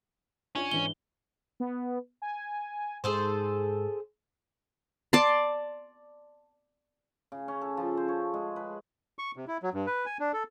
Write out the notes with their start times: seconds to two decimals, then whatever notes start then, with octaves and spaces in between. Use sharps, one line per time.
0.55 C#4 D4 F4 C#5
0.71 G#2 E3 D4 G7
1.60 B3
2.22 G#5
3.04 G#2 G#4 A4 C5
5.13 D5 A5 C6
7.32 C#3
7.48 C#4
7.61 A4
7.77 F3
7.97 C5
8.08 C#5
8.34 G#3
8.56 B4
9.19 C#6
9.36 C3
9.48 E4
9.63 F#3
9.74 G2
9.87 B4
10.06 G#5
10.20 D4
10.33 A4